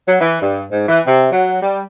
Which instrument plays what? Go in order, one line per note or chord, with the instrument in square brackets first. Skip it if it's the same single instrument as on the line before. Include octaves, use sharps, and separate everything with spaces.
[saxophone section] F#3
E3
G2
G#2
E3
C3
F#3
G3